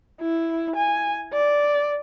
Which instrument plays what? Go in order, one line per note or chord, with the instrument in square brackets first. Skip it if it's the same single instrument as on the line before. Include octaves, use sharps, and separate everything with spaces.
[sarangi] E4
G#5
D5